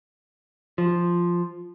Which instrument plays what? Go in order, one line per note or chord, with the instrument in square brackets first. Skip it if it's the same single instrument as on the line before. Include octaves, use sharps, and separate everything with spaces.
[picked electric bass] F3